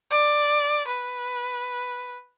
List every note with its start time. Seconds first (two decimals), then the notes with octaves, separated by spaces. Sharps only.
0.11 D5
0.87 B4